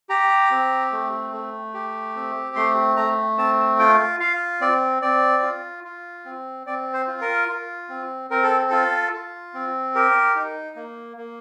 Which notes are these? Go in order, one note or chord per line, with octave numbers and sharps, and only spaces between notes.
G4 A#5
C4
A3
A3
G4
C4
A3 C6
A3 A#5
C4 A5
F4 G5
F4 F5
C4 D5
C4 D5
F4
F4
C4
C4 D5
C5
F4
A#4
F4
C4
C4 A#4
A4
F4 A4
F4
C4
G4 A#4
D#4
A#3
A#3